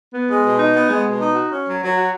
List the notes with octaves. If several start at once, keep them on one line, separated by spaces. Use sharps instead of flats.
B3
G#3
B2
D#4
B3
G#3
B2
D#4
F#4
C#4
F#3
F#3
F#4